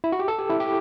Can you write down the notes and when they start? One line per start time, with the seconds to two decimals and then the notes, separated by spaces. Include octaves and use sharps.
0.04 E4
0.12 F#4
0.19 G4
0.28 A4
0.39 G4
0.50 E4
0.60 G4